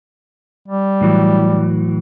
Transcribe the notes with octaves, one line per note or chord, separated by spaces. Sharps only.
G3
A2 E3 F#3